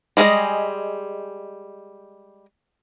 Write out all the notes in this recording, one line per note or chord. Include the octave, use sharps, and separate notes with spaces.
G3 G#3 G#4 A4 D#5